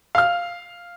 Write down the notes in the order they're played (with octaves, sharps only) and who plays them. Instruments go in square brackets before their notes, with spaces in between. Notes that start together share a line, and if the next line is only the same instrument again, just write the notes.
[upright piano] F5 F6